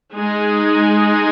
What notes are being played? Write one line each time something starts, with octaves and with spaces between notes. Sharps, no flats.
G#3 D#4 G#4